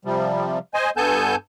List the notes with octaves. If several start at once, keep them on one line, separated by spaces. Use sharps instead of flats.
C3 F3 G3
C5 D#5 G#5
G2 B3 A4 G#5 A5 G6